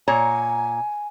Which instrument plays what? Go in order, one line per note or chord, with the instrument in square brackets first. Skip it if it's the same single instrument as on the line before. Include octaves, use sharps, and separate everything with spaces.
[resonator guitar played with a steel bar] A#2 C#5 A#5 [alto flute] G#5